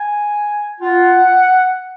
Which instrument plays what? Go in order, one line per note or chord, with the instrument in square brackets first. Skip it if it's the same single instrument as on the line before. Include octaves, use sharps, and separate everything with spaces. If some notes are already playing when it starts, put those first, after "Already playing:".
Already playing: [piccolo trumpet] G#5
[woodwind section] F4 [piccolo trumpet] F#5